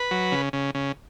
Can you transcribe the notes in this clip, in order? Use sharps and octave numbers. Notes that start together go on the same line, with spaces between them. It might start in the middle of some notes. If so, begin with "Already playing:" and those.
Already playing: B4
F#3
C#3
C#3
C#3